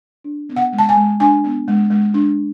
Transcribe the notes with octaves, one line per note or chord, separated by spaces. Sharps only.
D4
B3
F#5
G#3
A5
G#5
G#3
D4 G#5
B3
G#3
G#3
D4